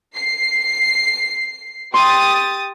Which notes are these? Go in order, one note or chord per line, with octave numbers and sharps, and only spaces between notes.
C7
G4 C6 D#6 A6